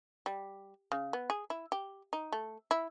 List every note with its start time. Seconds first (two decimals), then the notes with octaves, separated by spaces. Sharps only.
0.26 G3
0.92 C#3
1.13 B3
1.30 G#4
1.50 E4
1.72 G4
2.13 D#4
2.32 A3
2.71 E4